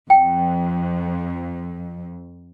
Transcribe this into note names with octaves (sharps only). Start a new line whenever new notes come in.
F2 G5